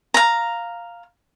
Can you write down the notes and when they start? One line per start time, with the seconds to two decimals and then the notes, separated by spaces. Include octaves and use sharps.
0.14 F5 A#5